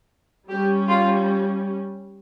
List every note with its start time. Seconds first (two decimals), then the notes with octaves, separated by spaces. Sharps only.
0.49 G3 C#4 G4
0.88 F4